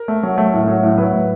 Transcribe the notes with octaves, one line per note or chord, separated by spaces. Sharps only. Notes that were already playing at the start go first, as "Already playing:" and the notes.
Already playing: A#4
A3
F#3
A3
A2
F#3
A2
F#3 B4
A2